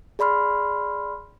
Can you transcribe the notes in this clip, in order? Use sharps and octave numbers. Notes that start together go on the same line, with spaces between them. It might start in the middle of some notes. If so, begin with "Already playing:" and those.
G#4 D5 B5 C6 F6